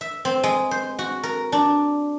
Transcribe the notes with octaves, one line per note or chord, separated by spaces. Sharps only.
E5
C4
G#3
C5
F#4
A#4
D4